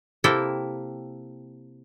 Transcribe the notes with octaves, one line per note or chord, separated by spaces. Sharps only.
C3 A#3 E4 A4 G5